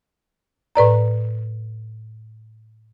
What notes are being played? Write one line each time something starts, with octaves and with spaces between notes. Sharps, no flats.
A2 B4 D5 A#5